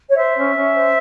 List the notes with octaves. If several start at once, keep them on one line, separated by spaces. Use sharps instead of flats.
C#5
C5 E5
C#4
C#4
C5